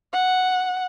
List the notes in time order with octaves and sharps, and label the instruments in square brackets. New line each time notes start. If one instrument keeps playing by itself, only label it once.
[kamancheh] F#5